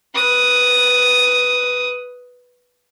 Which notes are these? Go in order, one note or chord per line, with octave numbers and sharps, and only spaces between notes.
B4 D#6